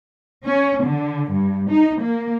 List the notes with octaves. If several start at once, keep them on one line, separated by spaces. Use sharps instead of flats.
C#4
D3
G2
D#4
A#3